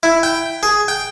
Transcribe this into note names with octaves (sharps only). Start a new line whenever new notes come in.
E4
G5
G#4
G5